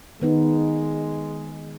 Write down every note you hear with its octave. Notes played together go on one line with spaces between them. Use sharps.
D#3 G#3 B3 D#4